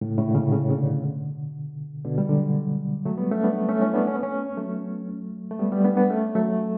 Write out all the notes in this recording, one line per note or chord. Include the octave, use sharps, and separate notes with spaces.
A2 C#3
A2 C#3
D3
A2 C#3
A2 C#3
C#3
B2 D3
B2 D3
G3
D3 F#3
F#3 A3
G3 B3
A3 C#4
B3 D4
A3 C#4
C#4 E4
B3 D4
C#4
B3
A3 C#4
F#3 A3
A3
G3 B3
G3 B3
B3 D4
B3 D4
A3 C#4
F#3 A3